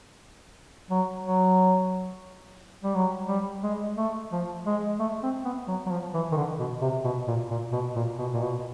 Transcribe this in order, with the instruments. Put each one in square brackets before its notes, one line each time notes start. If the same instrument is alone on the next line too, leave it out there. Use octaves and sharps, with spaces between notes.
[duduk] F#3
F#3
G3
F#3
G3
G#3
A3
F3
G#3
A3
C4
B3
F#3
F#3
F3
E3
D#3
D3
B2
C3
B2
A#2
A#2
B2
A#2
B2
A#2
B2